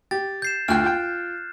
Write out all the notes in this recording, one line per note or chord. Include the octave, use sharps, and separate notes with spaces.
G4 A6
G6 C7 E7
D2 F4 G5 F6 F#6
F4 G5